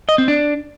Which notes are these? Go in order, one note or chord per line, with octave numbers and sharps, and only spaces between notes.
D#5
C4
D4